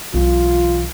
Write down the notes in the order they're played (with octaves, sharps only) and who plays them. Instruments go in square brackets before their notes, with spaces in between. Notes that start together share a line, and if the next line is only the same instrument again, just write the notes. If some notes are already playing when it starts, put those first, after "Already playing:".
[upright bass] B1 E3 [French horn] F4